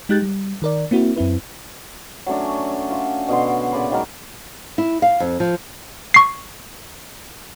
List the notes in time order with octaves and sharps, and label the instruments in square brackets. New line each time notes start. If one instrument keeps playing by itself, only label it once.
[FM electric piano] G#3 D#4 G4 F#6 G6 A6
G3
D#3 A#4 D5
A#3 C4 E4 F#4
F#2 C4 E4 B4
[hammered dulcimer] F#3 A3 C#4 D4
F4 E5 F5
B2 D3 B3 C6
A#2 C#3 D5 B5
D#3 F#3 G#3 A#4
[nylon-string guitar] E4
F5
F2
F3
[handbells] C#6 C7